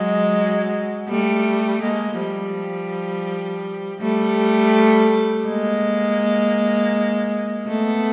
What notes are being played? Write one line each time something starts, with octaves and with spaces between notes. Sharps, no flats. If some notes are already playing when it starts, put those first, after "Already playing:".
Already playing: F#3 G#3
G3 A3
G#3 A#3
F3 G3
G3 A3
G#3 A#3
A3 B3